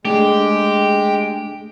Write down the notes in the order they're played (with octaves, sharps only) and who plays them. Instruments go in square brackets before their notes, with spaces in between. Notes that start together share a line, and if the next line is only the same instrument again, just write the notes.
[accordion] G#3 [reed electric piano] A3 D4 G#4 [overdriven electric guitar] G4